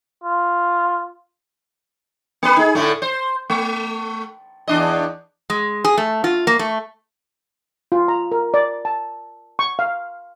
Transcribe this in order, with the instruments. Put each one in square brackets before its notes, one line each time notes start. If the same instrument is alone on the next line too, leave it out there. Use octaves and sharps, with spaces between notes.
[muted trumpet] F4
[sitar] A#3 B4
D#4 G#4
A2 D3 A3
C5
A3
E2 D4 D#5
[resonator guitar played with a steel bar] G#3
G#4
A3
F4
A#3
A3
[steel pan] F4
A#5
A#4
D5
A5
C#6
F5